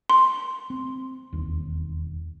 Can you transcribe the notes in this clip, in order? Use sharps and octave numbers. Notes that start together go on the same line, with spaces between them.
C6
C4
E1 D#2